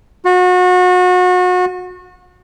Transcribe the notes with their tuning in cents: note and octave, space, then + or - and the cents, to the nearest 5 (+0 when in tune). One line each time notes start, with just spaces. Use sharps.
F#4 -30